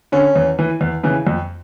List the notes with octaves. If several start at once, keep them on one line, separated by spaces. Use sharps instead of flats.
D3 C#4
E2
E3
E2
C#3 E3
F2